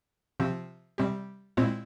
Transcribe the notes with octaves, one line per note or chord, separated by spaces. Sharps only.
C3 F3 C4
C3 G3 C4 G4
A#2 G#3 C4 E4